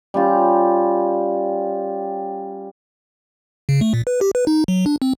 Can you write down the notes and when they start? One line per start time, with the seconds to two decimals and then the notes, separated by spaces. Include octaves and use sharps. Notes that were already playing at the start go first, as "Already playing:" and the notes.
0.14 G3 C#4 F4
3.69 C#3
3.81 A3
3.94 A#2
4.07 B4
4.21 G4
4.35 B4
4.47 D#4
4.68 F#3
4.86 D4
5.02 C4